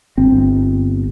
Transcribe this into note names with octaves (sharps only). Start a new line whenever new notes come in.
G1 C4